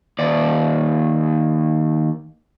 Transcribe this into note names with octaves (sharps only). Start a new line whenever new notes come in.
D#2 D5